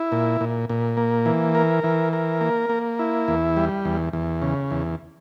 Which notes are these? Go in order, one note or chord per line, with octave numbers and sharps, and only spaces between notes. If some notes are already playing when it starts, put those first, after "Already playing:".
Already playing: E4
A#2
A#2
A#2
A#3
E3
A#4
E3
A#4
A#3
A#3
E4
E2
G3
E2
E2
C#3
E2